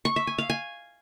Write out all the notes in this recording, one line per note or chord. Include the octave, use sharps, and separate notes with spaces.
C#6
E5
G#5
F5
G#5